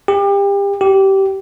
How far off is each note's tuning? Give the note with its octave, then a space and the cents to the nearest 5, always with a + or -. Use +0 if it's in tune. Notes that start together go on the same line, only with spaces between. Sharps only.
G4 +30
G4 -20